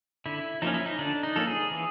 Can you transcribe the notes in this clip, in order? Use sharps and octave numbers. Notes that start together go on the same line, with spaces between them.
D3 E4
F3 A#3 C#4 D#4
E4
D#4
D3 D4
D#4
F3 A#3 C#4 A4
G#4
E3